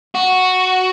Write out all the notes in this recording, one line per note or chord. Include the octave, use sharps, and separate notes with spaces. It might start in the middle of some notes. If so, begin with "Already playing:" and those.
F#4